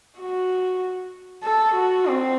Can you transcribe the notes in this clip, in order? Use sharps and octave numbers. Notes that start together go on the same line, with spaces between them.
F#4
A4
F#4
C4